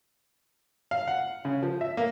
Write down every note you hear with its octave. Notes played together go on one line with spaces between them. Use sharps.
F5
F#5
C#3
F3
E5
A#3